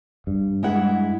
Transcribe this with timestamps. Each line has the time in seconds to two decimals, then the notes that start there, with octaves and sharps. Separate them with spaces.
0.27 G2
0.63 G#3 E4 F#5